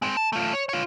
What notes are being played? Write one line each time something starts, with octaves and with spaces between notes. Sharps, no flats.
G#3 C4
A5
A3 F4
C#5
F4 C#5